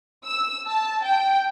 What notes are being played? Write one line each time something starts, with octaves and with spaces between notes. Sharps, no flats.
E6
A5
G5